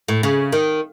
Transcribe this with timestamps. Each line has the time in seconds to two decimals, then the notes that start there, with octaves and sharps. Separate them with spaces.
0.08 A2
0.23 C#3
0.52 D#3